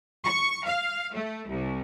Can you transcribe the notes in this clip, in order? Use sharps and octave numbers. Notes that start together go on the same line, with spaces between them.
C#6
F5
A3
C2